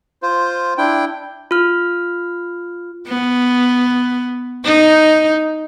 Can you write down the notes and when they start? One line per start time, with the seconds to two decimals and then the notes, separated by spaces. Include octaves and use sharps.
0.23 F4 C5
0.78 D4 E4 G5
1.51 F4 F6
3.08 B3
4.64 D#4